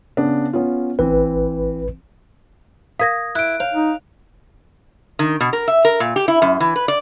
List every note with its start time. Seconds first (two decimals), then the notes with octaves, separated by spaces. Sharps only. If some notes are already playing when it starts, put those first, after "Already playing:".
0.17 C#3 B3 D4
0.53 B3 C#4 F4
0.99 A1 E3 C4 B4
3.00 A#4 F5 D#6 G#6 A#6
3.35 E4 F#6 D7
3.60 C#5 F5
3.74 D#4
5.19 D#3
5.40 B2
5.53 A#4
5.68 E5
5.85 A#4
6.00 A#2
6.16 G4
6.28 E4
6.42 F#2
6.60 E3
6.76 B4
6.88 D5